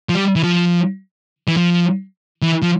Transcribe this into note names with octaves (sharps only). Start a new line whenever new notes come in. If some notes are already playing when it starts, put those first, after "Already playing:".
F3
G3
E3
F3
E3
F3
E3
F3